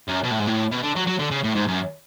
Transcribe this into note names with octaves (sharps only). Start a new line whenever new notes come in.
F#2
B2
A2
G#2
A2
B2
D3
F#3
F#3
D3
C#3
A2
G#2
F#2